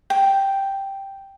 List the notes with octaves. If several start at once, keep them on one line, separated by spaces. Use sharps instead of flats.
G5